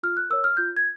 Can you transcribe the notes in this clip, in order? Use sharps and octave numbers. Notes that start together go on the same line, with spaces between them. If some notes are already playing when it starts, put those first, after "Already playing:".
F4 F6
F#6
A#4 C#5 E6
F6
F4 G6
G#6